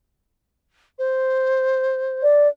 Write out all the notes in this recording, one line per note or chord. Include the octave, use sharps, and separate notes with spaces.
C5
D5